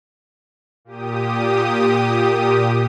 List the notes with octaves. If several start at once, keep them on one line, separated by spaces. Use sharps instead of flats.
A#2 G4 D#6